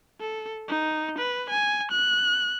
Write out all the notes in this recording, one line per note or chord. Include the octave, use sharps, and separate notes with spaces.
A4
D#4
B4
G#5
F#6